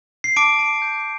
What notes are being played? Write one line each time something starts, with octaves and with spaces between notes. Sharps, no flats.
C7
A5 D6 D7
A5
G6